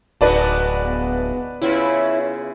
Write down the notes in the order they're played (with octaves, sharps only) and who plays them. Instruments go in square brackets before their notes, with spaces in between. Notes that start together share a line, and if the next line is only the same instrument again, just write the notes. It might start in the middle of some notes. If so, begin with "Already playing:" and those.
[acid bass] D1 [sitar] G#3 D#4 F#4 [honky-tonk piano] B4 D5 A5
[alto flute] B3
[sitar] C#3 B3 F4 [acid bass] E4 [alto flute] C#5